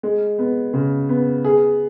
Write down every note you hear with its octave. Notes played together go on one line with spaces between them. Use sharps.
G#3
B3
C#3
B3
G#4